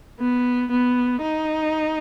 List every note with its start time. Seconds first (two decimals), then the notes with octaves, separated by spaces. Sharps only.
0.20 B3
0.71 B3
1.22 D#4